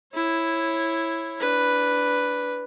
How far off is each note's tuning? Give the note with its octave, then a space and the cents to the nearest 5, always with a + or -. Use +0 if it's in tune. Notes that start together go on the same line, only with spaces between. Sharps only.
E4 +0 C#5 -20
D4 -15 B4 +0